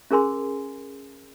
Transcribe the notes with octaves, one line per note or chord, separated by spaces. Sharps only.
C#4 G#4 A#4 G#5 C6